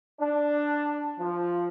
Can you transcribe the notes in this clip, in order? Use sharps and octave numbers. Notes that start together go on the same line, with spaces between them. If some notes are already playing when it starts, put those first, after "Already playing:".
D4
F3